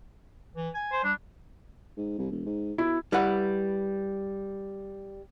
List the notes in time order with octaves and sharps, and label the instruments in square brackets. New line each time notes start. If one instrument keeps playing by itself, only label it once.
[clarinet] E3
G#5
[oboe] C5
[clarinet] G3 [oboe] D4
[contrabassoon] G#2
C2
E1
G#2
[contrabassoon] B2 [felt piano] E4
[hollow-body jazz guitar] G3 E4 B4 F#5